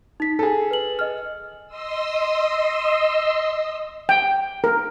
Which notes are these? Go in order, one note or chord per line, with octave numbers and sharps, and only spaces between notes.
D#4 B6
G#4 A4 A5
B4 F#7
D#5 F6
D#5 C6 D#6 E6
G5
A#4